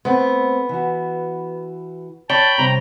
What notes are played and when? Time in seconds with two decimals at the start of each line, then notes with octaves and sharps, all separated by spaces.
0.05 A3 B3 C4
0.69 E3 F#4
2.30 C#5 G5 A5 B5 G6
2.58 C3 G3 C4 A#5